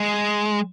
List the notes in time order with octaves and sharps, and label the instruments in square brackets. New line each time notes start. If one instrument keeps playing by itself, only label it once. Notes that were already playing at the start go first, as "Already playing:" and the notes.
Already playing: [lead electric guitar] G#3